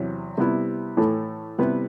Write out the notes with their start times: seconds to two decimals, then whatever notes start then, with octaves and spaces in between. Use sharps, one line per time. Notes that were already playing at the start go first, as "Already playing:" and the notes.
Already playing: E2 C3 F#3
0.37 C3 G3 B3 E4
0.97 A2 E3 A3
1.58 C3 G3 B3 E4 B4